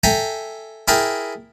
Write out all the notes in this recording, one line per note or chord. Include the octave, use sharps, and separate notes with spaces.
A4 E5 G5 G#5 A#5
E4 G#4 A#4 G5 A5